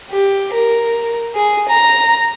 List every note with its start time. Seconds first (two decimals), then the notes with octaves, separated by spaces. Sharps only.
0.10 G4
0.53 A#4
1.35 G#4
1.68 A#5